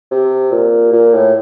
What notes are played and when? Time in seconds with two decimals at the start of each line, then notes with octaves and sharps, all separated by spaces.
0.11 C3
0.52 A#2
0.93 A#2
1.14 A2